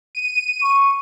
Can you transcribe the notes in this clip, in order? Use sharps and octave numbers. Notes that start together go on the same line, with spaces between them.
D#7
C#6